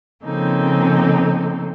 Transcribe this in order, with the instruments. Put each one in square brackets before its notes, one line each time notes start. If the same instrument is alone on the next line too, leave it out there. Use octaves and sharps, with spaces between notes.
[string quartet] C#3 F3 A#3 C4 D#4 A4